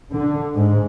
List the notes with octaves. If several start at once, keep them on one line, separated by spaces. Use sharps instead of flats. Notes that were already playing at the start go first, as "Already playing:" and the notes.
D3
G#2